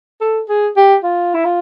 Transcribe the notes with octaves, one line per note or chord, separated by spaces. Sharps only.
A4
G#4
G4
F4
E4
F4